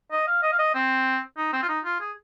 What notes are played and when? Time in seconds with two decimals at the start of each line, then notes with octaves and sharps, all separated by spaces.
0.12 D#5
0.27 F5
0.43 D#5
0.52 F5
0.59 D#5
0.74 C4
1.37 D#4
1.53 C4
1.63 F4
1.69 D#4
1.85 F4
2.00 G#4